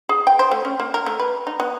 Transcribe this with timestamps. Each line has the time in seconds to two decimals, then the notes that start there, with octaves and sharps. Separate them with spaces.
0.09 G#4
0.27 G5
0.39 C5
0.51 A3
0.65 C#4
0.80 A#3
0.94 A#4
1.06 A3
1.20 B4
1.47 D#4
1.60 B3